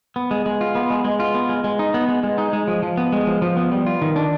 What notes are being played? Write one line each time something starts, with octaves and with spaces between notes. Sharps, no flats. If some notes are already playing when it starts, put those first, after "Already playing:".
B3
G#3
G#3
F4
B3
G#3
G#3
F4
B3
G#3
G#3
D#4
B3
G#3
G#3
D#4
G#3
F3
F3
B3
G#3
F3
F3
B3
G3
F4
D#3
D4